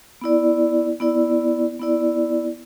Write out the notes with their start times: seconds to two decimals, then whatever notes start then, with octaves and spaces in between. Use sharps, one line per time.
0.21 B3 E4 D5
1.00 B3 E4 D5
1.79 B3 E4 D5